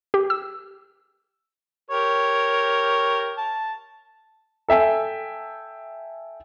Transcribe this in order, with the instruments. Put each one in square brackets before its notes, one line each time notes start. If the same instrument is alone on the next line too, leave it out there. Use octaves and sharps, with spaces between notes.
[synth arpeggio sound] G4
E6
[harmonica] G4 A#4 C#5
A5
[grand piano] A4 E5 G5 G#5